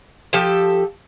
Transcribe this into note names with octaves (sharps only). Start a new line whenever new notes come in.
F3 G4 A4